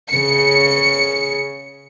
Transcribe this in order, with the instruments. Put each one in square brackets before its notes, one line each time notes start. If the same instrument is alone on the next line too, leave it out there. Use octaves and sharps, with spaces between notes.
[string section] C#3 C#7